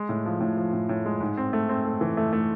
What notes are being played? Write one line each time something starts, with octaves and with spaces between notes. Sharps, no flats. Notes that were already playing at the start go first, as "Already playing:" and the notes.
Already playing: G#3
A2
F3
A2
F3
A2
A2
G#3
G#2
C4
A3
C4
A3
E3
A3
A3